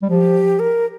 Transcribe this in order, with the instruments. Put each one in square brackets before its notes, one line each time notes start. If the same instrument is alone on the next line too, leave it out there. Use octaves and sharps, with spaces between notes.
[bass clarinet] G3
[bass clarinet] F3 [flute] G4
[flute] A#4